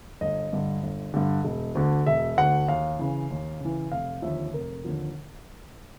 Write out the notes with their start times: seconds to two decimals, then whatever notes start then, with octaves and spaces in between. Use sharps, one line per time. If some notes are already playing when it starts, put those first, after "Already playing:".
0.21 G1 D#5
0.53 G2 D3
0.83 G1
1.14 G2 D3
1.45 E1
1.75 D2 D3
2.06 E1 E5
2.37 D2 D3 F#5
2.68 D#2 F5
2.99 C#3 E3
3.31 D#2
3.61 C#3 E3
3.92 F1 F5
4.22 D#2 D3 F3 E5
4.53 F1 A#4
4.84 D#2 D3 F3